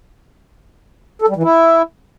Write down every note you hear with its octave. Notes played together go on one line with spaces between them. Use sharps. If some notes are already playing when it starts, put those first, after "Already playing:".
A4
G3
E3
E4